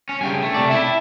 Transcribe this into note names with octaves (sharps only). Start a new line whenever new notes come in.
C#4
G2 C#3 G5 G#5
A3
C3 G4 D5
E4 E5 G5 A5